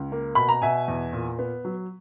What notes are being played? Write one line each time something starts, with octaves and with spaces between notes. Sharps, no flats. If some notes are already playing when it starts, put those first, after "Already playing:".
Already playing: C#2
A#3
B2 B5
A#5
B2 E5 G#5
E2
A#2
B3
F#3